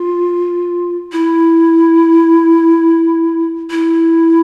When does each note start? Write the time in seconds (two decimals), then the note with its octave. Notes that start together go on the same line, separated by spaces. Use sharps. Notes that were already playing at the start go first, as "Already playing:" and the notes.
Already playing: F4
1.12 E4
3.71 E4